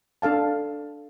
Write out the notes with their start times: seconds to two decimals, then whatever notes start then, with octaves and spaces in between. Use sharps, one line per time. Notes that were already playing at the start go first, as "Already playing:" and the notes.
0.22 D4 A4 F5 A5